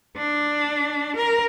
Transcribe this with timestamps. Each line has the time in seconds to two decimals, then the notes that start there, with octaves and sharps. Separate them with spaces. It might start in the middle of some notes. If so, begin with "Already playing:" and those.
0.17 D4
1.16 A#4